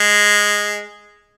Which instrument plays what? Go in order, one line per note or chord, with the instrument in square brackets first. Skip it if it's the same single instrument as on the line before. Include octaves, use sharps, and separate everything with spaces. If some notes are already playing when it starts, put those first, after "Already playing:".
Already playing: [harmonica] G#3